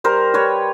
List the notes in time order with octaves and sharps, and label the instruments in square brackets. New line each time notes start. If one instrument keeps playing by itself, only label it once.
[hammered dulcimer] G3 A#4 C5
G3 B4 C#5